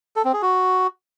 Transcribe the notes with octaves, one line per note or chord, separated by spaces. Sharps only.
A4
C4
G#4
F#4